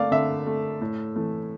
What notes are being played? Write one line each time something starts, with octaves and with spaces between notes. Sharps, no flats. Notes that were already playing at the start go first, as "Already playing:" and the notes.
Already playing: D3 A3 D5 F5
D3 E5
A3
A2
E3 A3